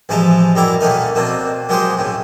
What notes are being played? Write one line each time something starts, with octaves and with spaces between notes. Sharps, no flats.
A1 E3 F3 G#3 A5 A#5
F#2 G3 E4 A#5 D6
D3 A3 A#3 C#4 D#4 A#4
B2 A#3 C4 D4
F#3 G#3 A#3 G4 C5 D#6
A2 C#3